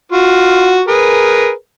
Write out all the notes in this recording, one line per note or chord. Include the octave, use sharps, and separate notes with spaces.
F4 F#4
G#4 A#4 B4